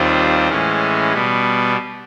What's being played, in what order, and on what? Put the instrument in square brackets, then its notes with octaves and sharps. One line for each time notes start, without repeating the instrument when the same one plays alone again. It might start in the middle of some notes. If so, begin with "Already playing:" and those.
Already playing: [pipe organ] D#2 D#3 G3 C4 F4
A2 E3 G#3 C#4
B2 G3 B3